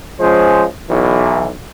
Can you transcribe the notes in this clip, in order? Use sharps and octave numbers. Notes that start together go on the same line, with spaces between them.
F3 G#3 C#4 C5
B1 E3